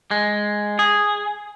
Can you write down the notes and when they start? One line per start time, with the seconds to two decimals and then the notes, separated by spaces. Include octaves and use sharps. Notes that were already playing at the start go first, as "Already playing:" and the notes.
0.11 G#3
0.79 G#4